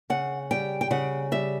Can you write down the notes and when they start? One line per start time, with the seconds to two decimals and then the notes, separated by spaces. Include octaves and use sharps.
0.10 C#3 F#5
0.51 G3 G5
0.81 G5
0.91 C#3 F#5
1.31 G3 E5